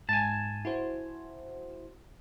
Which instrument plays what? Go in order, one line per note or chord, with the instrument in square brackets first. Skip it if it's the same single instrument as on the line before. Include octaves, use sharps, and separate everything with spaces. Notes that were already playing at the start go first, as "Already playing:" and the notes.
[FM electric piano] G#2 [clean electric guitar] G#5 A5
[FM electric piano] E4 F#4 C5